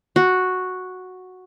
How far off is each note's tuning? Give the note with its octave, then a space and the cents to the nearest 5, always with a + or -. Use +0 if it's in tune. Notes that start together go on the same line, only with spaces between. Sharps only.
F#4 -5